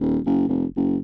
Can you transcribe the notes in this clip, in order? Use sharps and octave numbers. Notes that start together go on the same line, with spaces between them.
D#1
F#1
F1
F#1